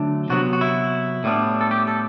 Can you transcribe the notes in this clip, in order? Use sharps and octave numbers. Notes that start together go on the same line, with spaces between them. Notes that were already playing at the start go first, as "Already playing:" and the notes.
Already playing: D3 F#3 A3 D4
C3 F#3 B3 F#4
F#4
E4
A2 G3 B3 D4
A4
G4
A4